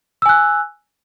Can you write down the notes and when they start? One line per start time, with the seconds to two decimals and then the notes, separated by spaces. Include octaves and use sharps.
0.22 E6
0.26 G#5
0.29 F#6